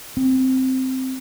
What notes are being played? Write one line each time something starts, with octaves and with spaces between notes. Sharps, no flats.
C4